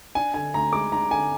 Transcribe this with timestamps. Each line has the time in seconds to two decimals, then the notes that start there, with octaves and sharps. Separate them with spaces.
0.15 D4 G#5
0.34 D3 G#5
0.54 D2 A#5
0.73 G#3 D6
0.92 D4 A#5
1.11 D3 G#5